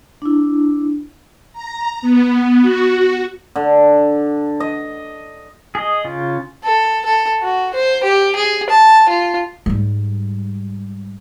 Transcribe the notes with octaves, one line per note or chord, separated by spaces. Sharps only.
D4 E4
A#5
B3
F#4
D3
D#5
G#4 D#5
C#3 F4
A4
A4
F#4
C5
G4
G#4
A5
F4
G#2 G3